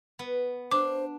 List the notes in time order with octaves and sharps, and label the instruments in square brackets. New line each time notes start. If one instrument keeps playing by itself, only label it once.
[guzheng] B3
[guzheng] D4 [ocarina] C5 [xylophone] D6